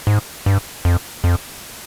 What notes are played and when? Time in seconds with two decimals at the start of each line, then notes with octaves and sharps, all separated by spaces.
0.07 G#2
0.46 G2
0.85 F2
1.24 F2